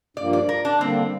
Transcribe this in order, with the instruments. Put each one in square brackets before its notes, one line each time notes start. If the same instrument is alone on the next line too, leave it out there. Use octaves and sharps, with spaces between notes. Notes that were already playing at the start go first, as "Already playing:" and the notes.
[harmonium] G2 F3 A#3 [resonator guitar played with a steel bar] D5
[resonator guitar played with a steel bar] D5
A#4
D4
[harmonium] D3 G3 A#3 [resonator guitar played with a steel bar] C4